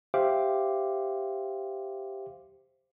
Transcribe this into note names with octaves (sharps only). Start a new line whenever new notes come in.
G4 C5 E5 F5 D6